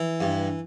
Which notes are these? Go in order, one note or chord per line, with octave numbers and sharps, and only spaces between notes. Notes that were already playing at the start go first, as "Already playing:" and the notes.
Already playing: E3
G2